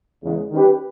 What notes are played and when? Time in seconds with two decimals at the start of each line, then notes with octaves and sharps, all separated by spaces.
0.23 E2 C#3 E3 G#3 B3
0.51 D#3 G3 C#4 G4 B4